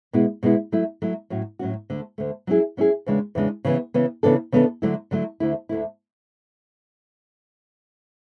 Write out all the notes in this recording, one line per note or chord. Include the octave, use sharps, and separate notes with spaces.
B2 G#3 B3 E4
B2 G#3 B3 E4
F#3 A3 E4
F#3 A3 E4
A2 F#3 C#4 F#4
A2 F#3 C#4 F#4
D2 D3 A3
D2 D3 A3
F#3 C#4 E4 G#4
F#3 C#4 E4 G#4
E2 C#3 G#3 D4
E2 C#3 G#3 D4
C#3 E3 B3
C#3 E3 B3
C#3 E3 B3 D4 A4
C#3 E3 B3 D4 A4
D3 F#3 A3 E4
D3 F#3 A3 E4
D2 D3 A3 E4
D2 D3 A3 E4